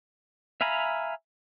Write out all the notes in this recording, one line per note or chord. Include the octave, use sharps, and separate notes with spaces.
E5 F5 G#5 A#5 B5